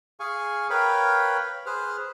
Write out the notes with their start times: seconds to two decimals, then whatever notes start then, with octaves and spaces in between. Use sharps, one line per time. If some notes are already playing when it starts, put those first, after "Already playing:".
0.20 G#4 F5 G#5 C#6
0.70 A#4 B4 C#5 F5 G5 B5
1.66 G#4 B4 C5 F6